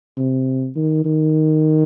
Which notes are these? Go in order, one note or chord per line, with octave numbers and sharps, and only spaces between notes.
C3
D#3
D#3